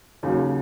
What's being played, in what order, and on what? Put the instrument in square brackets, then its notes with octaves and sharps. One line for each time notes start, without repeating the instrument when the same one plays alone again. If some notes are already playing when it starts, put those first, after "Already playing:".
[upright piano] D#2 C#3 F#3